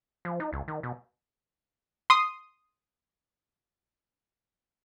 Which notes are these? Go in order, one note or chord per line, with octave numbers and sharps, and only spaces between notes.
F3
D#4
C#2
D#3
B2
C6 D#6